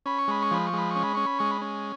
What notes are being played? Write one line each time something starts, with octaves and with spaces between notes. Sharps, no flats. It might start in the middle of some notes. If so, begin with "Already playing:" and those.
C#4 B5
C#6
G#3 B5
C#6
F3 B5
C#6
G#3 B5
C#4 C#6
B5
C#4 C#6
B5
G#3 C#6
B5
C#4